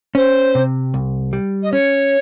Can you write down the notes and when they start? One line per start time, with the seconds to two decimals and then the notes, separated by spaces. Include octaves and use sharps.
0.15 C#4 C5
0.55 C3
0.94 C2
1.33 G3
1.63 D#5
1.72 C#4 C#5